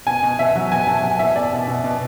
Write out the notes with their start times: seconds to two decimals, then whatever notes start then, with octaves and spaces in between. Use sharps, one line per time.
0.07 B2 G#5
0.23 B2
0.39 B2 E5
0.55 F#3
0.72 B2 G#5
0.87 F#3 A5
1.03 F#3 G#5
1.19 B2 E5
1.36 B2 D5
1.52 B2
1.68 B2
1.84 B2